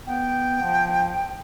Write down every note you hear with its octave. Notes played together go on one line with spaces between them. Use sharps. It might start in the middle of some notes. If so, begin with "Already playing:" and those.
B3 G5
F3